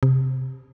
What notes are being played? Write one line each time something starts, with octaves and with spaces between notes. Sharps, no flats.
C3